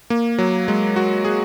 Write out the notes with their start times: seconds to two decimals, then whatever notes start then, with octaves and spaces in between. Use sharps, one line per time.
0.10 A#3
0.38 F#3
0.68 G#3
0.96 F#4
1.25 G#4